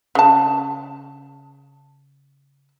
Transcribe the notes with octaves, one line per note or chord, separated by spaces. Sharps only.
C#3 A5